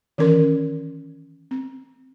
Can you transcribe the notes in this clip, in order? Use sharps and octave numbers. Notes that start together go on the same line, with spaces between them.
D#3 E3 C#4 A#4 C6
C4